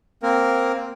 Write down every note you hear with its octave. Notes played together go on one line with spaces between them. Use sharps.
A#3 C4 A#4